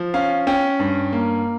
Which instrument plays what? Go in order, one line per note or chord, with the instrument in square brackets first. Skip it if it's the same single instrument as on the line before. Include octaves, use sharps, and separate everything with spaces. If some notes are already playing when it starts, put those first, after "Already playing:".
Already playing: [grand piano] F3
C#4 F5
C#4 G5
G2
A#3